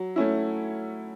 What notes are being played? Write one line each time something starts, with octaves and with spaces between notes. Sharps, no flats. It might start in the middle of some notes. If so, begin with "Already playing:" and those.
Already playing: F#3
A3 C#4 E4